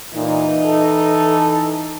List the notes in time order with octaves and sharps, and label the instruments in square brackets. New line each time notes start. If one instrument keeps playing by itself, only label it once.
[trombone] A#2 [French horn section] E3 D#4
[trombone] A4